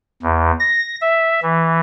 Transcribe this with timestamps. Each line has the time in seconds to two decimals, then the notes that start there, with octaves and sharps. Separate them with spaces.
0.22 E2
0.59 A#6
1.01 E5
1.42 E3